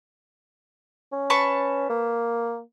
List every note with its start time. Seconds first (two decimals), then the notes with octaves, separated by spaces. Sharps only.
1.12 C#4
1.30 B4 A5 C#6
1.90 A#3